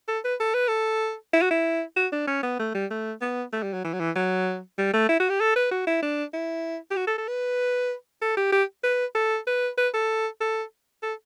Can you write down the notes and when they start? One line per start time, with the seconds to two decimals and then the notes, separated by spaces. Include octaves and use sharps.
0.08 A4
0.24 B4
0.40 A4
0.54 B4
0.68 A4
1.33 E4
1.42 F#4
1.51 E4
1.96 F#4
2.12 D4
2.27 C#4
2.43 B3
2.59 A3
2.75 G3
2.91 A3
3.22 B3
3.53 A3
3.63 G3
3.74 F#3
3.84 E3
3.94 F#3
4.00 E3
4.16 F#3
4.78 G3
4.93 A3
5.09 E4
5.20 F#4
5.30 G4
5.40 A4
5.56 B4
5.71 F#4
5.87 E4
6.03 D4
6.34 E4
6.91 G4
6.96 F#4
7.07 A4
7.18 A4
7.28 B4
8.22 A4
8.37 G4
8.52 G4
8.84 B4
9.15 A4
9.47 B4
9.78 B4
9.94 A4
10.41 A4
11.03 A4